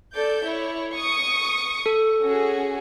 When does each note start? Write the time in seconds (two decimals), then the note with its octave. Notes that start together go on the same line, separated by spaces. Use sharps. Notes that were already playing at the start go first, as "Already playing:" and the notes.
0.14 A4 D5 G6
0.43 E4 C#5
0.95 C#6 D#6
1.86 A4
2.23 C#4 F#4 G#4